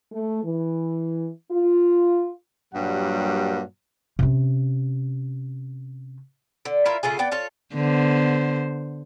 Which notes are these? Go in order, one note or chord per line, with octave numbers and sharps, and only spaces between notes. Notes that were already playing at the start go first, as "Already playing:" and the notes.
A3
E3
F4
G2 A#2 F#3 G3 A#3 F#5
C3 C#4
D3
E4 F4 A#4 E5
C#3 A3 F4 G#4
B3 D5 G5
F4 A4 C#5
D3 B3 C5